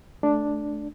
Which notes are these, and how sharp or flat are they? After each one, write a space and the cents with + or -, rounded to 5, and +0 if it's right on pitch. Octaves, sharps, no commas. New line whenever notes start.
A3 -20 D4 +0